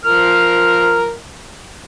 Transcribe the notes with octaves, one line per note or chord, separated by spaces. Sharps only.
F3 A#4 F6